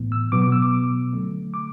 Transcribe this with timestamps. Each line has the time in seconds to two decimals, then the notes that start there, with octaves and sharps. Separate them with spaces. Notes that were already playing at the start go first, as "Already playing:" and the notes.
Already playing: A2 E3 B3
0.12 E6
0.32 B2 F#3 B3 D6
0.42 D6
0.52 E6
0.62 D6
1.13 D3 F#3 A3
1.54 D6